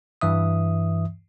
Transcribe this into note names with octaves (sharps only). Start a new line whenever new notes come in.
G2 E3 E5 D#6